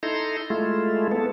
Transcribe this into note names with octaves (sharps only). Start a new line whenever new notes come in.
D#4 E4 A4 A#5 C6
G#3 A3 E4 F4
B3 A4